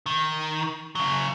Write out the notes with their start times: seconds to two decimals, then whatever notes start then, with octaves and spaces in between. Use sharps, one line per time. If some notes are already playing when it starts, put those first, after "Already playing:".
0.06 D#3
0.95 C#3 F#3